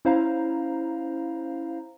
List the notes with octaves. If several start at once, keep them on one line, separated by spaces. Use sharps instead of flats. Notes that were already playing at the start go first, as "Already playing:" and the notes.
C#4 E4 C5 F5 A#5